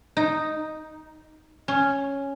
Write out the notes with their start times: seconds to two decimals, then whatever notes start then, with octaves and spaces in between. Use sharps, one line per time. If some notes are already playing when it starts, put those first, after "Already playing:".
0.17 D#4
1.68 C#4